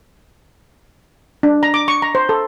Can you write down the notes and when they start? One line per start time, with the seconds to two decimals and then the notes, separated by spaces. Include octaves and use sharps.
1.43 D4
1.63 A#5
1.74 D6
1.88 C#6
2.02 A#5
2.15 C5
2.29 A4